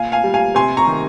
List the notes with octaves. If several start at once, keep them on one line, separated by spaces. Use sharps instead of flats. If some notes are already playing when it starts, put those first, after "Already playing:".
Already playing: A#2 F5 G#5
F5 G#5
G3
F5 G#5
C3 G#5 C6
A#5 C#6
D#3